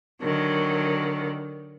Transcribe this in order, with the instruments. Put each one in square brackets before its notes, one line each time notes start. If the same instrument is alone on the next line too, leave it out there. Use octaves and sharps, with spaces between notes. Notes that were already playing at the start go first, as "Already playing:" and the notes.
[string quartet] D3 D#3 F#3